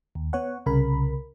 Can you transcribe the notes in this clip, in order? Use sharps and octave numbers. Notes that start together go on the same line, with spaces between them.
D#2
B3 C#5 F#5
C2 C#3 A#4 B5